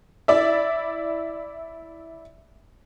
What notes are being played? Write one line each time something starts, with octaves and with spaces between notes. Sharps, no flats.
E4 D5 E5